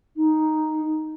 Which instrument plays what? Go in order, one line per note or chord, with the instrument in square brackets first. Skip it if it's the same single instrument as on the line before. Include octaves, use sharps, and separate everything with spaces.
[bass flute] D#4